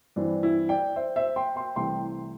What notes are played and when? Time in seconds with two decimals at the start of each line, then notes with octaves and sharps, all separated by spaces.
0.16 G2 E3 C4 D4
0.43 E4
0.69 D5 G5
0.96 C5 E5
1.16 C5 E5
1.36 G5 C6
1.56 G5 C6
1.76 C2 C3 E3 A3 G5 C6